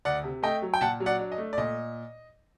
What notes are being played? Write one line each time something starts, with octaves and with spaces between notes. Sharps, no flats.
D2 D5 F#5
C3
A3 D#5 G5
F#3
G5
A#2 F#5 A5
F#3
D5 F#5
D4
D#5
A3
D5
A#2 D#5